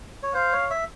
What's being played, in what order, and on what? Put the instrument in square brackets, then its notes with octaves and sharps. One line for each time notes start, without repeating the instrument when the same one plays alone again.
[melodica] C#5
[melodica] C5 [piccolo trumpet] F5
[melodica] C#5
E5